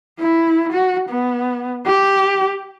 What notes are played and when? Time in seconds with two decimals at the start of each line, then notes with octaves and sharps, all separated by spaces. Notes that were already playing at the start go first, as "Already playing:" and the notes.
0.20 E4
0.73 F#4
1.09 B3
1.86 G4